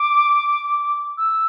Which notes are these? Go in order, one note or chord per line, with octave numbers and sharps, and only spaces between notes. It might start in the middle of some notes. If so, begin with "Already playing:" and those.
Already playing: D6
E6